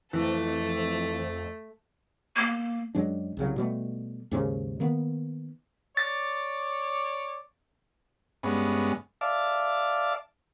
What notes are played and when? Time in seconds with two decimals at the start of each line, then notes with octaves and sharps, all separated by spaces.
0.13 F2 E3 A3 A4
2.36 A#3
2.95 F#2 F#3 G#3 D4
3.37 C2 C#3 F#3
3.56 B2 G3 A3
4.31 D#2 G#2 C#3 C#4
4.80 D#3 A#3 B3
5.97 C#5 D5 D6 A6
8.43 G2 G#3 B3 C#4
9.21 D5 E5 F5 A5 D6